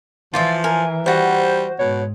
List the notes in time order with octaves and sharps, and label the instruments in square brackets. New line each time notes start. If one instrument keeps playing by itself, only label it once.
[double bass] E3 [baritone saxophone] F3 [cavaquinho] F4 D5 E5
[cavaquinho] A#4 [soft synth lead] G#5
[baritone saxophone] G3 [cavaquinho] F#4 F#5 [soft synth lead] C5
[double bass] G#2 [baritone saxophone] B2 [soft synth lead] C#5